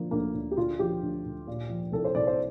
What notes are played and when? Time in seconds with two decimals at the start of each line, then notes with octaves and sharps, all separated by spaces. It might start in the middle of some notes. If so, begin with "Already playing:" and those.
Already playing: D3 F3 A#3
0.11 D2 A#3
0.34 D2
0.51 G4
0.57 D3 F4
0.79 F3 G4
1.02 D2
1.25 D2
1.47 A#2
1.69 F3
1.92 C2 A4
2.05 C5
2.15 C2 D5
2.27 C5